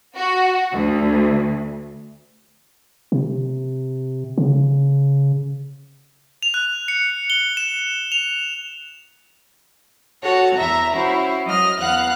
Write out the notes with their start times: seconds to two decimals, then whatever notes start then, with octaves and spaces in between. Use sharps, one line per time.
0.16 F#4
0.73 D2
3.12 C3
4.38 C#3
6.43 F7
6.54 F#6
6.88 C#7
7.30 G7
7.57 E7
8.12 F7
10.23 F#4 A4 C#5 F#5
10.57 E2 E5 A#5
10.93 C#4 E4 F#4 C5
11.45 F#3 D#5 F6
11.80 E2 B3 F5 F#5 F#6